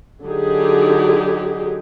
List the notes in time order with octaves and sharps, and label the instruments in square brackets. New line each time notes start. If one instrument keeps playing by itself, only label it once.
[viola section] D3 F#3 D#4 G4 G#4